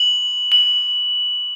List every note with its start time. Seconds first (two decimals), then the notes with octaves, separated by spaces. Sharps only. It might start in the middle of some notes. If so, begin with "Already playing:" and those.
Already playing: F#7
0.52 F#7